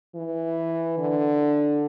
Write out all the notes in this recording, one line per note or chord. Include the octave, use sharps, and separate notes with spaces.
E3
D3